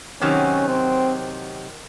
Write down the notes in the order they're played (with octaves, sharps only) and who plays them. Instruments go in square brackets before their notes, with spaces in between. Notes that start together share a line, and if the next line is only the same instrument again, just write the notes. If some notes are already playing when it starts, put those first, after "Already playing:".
[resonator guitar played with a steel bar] C3 D#3 F#3 [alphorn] C#4
[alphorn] C4